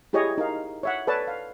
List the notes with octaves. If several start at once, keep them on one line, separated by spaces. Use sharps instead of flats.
E4 G4 G#4 C#5 D#5
D#4 A#4 F5
C#5 E5 F#5
A4 B4 C#5 D5 A5
F5